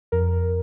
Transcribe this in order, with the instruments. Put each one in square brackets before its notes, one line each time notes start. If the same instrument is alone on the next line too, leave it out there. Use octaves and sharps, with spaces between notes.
[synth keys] F2 A#4